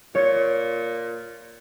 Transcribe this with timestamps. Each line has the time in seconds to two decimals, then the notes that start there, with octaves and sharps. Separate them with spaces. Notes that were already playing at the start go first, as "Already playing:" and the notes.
0.15 A#2 C#5